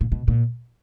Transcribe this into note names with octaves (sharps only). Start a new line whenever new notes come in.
A#2
B2
A#2